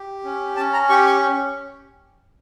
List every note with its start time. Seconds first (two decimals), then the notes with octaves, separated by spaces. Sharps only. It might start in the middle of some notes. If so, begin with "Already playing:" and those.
Already playing: G4
0.25 C#4
0.57 C#4 A5
0.73 A#5
0.89 G4 C#6
1.06 C#6